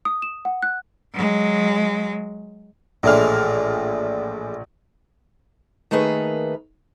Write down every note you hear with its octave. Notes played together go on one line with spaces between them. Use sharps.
D#6
E7
F#5
F#6
F#3 G#3
A#1 A2 E3 G#3 D5 F6
D#3 A3 A#3 G#4 B4